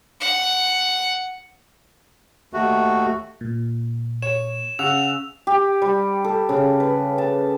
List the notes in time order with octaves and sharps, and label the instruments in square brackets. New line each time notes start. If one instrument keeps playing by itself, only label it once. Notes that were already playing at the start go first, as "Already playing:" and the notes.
[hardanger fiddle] F#5
[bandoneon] D#2 A3 F#4
[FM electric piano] A#2
[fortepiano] C#5 [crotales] E7
[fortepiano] C#3 [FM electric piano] F#5 E6 [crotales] F7
[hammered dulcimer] G4
G3
A4
C#3
B4
A5